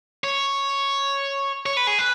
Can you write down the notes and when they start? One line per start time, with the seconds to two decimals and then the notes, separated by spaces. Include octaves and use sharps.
0.24 C#5
1.66 C#5
1.77 B4
1.87 G#4
1.99 B4